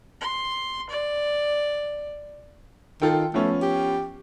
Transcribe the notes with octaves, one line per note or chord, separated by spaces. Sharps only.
C6
D5
D#3 F4 A4 G5
F3 A3 B3 C#4
G4